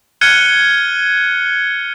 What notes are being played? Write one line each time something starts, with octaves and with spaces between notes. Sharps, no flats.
F6 F#6 G#6 C#7 D#7 G7